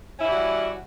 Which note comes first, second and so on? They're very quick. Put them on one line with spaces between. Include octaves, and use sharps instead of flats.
C#4 E4 E3 G3 F#4